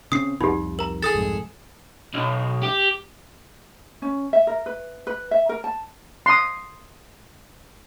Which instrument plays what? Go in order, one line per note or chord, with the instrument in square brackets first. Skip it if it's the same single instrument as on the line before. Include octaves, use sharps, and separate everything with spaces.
[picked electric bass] C#3 C4 C#4 [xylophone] D#6 C7
[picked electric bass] C2 F2 [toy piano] D#4 G4 [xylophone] B5
[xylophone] A#4 A#5
[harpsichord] G#4 A4 [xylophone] D#6 A6
[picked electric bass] C2 F2 G#2
[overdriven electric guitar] B1
G4
[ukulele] C#4
E5
A#4
B4
B4
E5
A#4
A5
[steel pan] C6 D#6